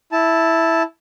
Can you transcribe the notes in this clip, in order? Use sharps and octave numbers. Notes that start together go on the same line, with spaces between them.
E4 A5